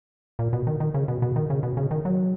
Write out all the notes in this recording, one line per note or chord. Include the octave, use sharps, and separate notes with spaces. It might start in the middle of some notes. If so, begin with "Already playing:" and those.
A#2
B2
D#3
D#3
C#3
B2
B2
D#3
C#3
B2
C#3
D#3
F#3